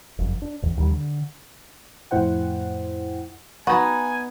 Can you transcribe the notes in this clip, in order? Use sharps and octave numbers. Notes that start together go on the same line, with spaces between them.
F#1 F2
D4
A1 E2
D#2 D#3 G3
D3
F2 A2 E4 C5 F#5 G5
B3 D#4 F#4 G#5